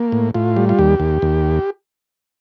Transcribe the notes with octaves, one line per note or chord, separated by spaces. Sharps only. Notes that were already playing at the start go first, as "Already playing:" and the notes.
Already playing: A#3
A2
A2 F4
G3
F4
D#2 G4
D#2
D#2